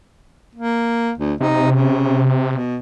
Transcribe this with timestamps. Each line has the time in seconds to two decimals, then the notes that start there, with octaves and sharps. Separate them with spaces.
0.55 A#3
1.18 D2
1.41 C3 D#4
1.72 C#3
2.50 B2